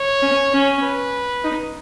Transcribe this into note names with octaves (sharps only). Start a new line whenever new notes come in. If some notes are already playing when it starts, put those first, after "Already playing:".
Already playing: C#5
C#4
C#4
B4
D#4